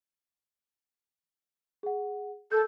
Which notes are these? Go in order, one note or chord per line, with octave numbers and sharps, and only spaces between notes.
G#4 F#5
A4 A#4 E6 G6